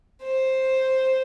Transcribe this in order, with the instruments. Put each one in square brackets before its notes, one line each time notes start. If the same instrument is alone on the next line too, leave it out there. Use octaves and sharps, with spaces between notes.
[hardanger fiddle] C5